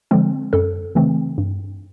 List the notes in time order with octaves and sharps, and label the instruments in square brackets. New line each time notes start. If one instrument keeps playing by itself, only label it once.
[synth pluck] D3 F3 G#3 C4
F#2 A4
C#3 E3 A3 C4
G2